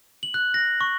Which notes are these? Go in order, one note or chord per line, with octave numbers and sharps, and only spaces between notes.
F#7
F#6
A#6
C#6